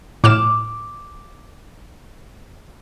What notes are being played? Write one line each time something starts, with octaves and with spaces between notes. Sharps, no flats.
A2 D6 F6 E7